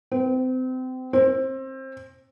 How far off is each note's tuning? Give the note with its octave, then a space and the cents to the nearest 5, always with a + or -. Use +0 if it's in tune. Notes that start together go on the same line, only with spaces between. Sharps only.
C4 -30
C4 +25